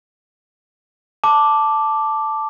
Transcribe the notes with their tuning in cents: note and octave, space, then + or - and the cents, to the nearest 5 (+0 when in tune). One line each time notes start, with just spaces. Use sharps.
A5 +0 D6 +0